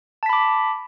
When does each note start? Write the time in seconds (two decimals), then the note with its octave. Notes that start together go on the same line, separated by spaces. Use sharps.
0.23 A5
0.26 B6
0.29 B5
0.33 D6